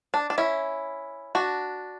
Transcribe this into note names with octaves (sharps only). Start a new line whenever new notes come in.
D4
D4
C#4 E4
D4 F#4